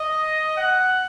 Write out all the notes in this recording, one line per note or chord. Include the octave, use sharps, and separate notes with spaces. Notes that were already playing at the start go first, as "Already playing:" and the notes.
Already playing: D#5
F#5